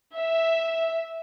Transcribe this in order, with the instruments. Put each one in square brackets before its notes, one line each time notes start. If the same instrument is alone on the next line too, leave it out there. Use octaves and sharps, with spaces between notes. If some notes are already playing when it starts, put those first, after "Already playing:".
[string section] E5